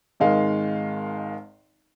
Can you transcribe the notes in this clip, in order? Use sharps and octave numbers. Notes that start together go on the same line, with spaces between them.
G#1 D#3 G#3 F5